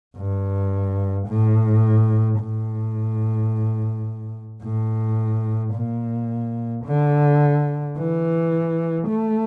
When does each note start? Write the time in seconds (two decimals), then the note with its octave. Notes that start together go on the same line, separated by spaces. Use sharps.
0.16 G2
1.28 A2
2.40 A2
4.63 A2
5.74 A#2
6.85 D3
7.98 E3
9.08 A3